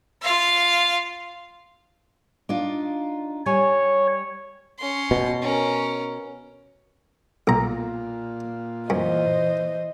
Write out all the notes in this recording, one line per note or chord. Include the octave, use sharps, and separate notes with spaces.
F4 F5
D4 D#4 F4
G3 C#5 G#5
C#4 C6
B2
C#4 A#4
B1 A#2 F4 A#5
F#2 E3 C5 D#5